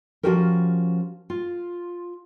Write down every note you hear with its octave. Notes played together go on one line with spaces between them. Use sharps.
F3 G#3 C#4 F#4 G4 A#4
F4